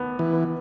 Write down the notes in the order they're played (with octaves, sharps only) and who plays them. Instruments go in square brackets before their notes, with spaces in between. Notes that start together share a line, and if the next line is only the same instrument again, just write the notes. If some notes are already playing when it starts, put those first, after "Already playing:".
Already playing: [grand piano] D#2 B3
[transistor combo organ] E3
[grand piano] B3